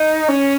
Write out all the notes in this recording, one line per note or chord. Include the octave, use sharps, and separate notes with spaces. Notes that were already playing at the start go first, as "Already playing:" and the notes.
Already playing: D#4
C#4